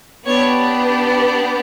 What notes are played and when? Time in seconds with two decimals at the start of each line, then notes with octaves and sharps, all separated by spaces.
0.25 B3 D4 G4 C#5